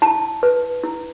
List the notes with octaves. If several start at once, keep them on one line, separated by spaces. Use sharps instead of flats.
E4 A5
B4
E4